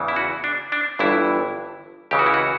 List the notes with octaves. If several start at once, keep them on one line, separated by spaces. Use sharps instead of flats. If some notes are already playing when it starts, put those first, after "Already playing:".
Already playing: E2 C#3 E3
E4
F#4
D4
D4
G1 G2 E3 E4
C#2 C#3 E3 G4
F#4
E4
F#4